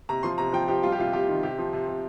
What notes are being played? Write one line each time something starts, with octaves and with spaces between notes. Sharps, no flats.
C3 A#5
F3 C6
C3 A#5
F3 G5
F3 G4
G3 F4
G4
C3 F4
C3 G4
D#3
C3 G4
F3
C3
C3